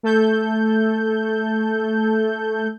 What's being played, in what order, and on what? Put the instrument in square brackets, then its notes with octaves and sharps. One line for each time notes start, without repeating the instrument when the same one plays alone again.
[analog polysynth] A3 A4 G6